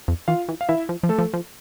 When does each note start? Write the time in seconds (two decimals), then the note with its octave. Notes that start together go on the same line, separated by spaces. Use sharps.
0.08 F2
0.28 E3 F4 F5
0.49 E3
0.61 F5
0.69 E3 E4 E5
0.89 F3
1.03 F3
1.09 A3 A4
1.18 F3
1.33 F3